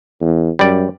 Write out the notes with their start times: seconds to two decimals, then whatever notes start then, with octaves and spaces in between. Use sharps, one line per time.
0.21 E2
0.59 F#2 G3 D5